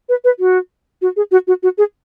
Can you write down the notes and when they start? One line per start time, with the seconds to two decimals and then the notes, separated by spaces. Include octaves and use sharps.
0.09 B4
0.24 B4
0.39 F#4
1.02 F#4
1.16 G#4
1.31 F#4
1.47 F#4
1.63 F#4
1.78 G#4